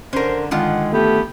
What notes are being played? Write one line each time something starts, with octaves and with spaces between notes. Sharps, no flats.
D3 C#4 A#4 C5
D3 D#3 G#3 F4 F#5
A3 B3 G4